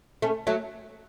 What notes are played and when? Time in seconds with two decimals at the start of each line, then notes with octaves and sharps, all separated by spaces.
0.22 A3 C#4
0.47 F#3 A3